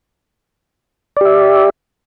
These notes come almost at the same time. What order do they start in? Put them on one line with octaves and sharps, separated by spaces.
D5 G4 E5